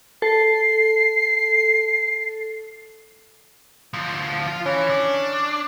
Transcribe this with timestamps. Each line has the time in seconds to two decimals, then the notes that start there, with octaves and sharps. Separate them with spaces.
0.22 A4 C7
3.93 D2 F3
4.48 F4
4.66 E3 C#4
4.90 D4